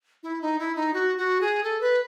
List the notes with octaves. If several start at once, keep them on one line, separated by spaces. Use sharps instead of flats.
E4
D#4
E4
D#4
F#4
F#4
G#4
A4
B4